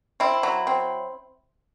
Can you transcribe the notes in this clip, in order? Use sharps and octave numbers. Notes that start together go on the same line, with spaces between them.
C4 E4
F#3
C4